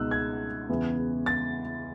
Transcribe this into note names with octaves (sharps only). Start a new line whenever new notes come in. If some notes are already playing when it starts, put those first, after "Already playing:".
Already playing: C#2 B2 G#3 D#4 E6 F#6
G#6
E2 C#3 E3 B3
A6